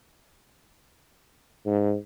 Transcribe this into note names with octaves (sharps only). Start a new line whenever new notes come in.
G#2